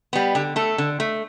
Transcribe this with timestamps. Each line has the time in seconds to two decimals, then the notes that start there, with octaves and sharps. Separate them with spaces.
0.13 G3 B3
0.35 D3 G4
0.56 A3 A4
0.78 D3
1.00 A3